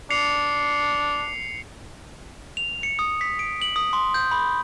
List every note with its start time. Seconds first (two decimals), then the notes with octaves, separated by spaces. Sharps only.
0.10 D4 C7 C#7 F7
2.57 F7
2.83 C#7
2.99 D#6
3.21 B6
3.39 D7
3.62 F#7
3.76 D#6
3.93 C6
4.14 G6
4.31 B5